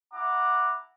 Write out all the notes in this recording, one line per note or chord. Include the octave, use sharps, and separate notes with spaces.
E4 F#5 A#5 D6